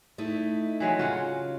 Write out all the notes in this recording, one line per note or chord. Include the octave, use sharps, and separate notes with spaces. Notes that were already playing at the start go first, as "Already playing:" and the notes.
A3 D#4 E4
E3 F#3 G#3
C#3 F4 F#4 F#5